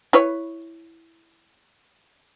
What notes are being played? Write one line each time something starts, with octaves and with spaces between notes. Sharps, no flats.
E4 B4 C#5